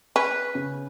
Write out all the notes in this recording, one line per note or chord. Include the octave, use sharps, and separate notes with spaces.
C#4 B4
C#3